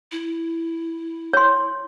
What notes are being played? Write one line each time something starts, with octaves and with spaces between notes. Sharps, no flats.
E4
C#5 C6